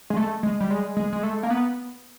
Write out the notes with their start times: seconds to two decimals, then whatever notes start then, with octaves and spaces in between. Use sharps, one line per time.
0.10 G#3
0.16 A3
0.43 G#3
0.60 G3
0.70 G#3
0.97 G#3
1.13 G#3
1.23 A3
1.43 A#3
1.50 B3